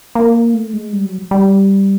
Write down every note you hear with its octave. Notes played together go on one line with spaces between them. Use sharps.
A#3
A3
G#3
G3
F#3
G3